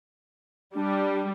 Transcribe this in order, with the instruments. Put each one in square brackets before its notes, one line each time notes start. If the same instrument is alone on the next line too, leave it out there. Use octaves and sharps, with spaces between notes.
[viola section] G3 [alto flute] D4